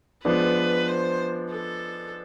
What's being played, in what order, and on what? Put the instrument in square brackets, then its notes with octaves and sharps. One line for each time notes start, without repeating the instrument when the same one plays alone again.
[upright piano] F3 G#3 B3 D4 [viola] B4
[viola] C5
A4